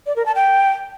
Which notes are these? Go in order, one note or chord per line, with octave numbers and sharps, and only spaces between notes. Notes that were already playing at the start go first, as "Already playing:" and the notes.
D5
A#4
A5
G5